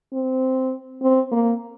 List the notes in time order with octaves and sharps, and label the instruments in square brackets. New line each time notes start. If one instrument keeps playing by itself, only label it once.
[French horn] C4
C4
A#3